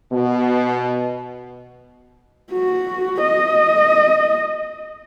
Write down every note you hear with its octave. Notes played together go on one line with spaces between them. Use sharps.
B2
F#4
D#5